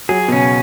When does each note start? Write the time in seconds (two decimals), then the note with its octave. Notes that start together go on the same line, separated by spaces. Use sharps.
0.09 F#3 G#4
0.28 B2
0.32 C#3 C#4